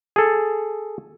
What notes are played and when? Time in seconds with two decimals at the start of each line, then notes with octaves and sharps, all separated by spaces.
0.16 G#4 A4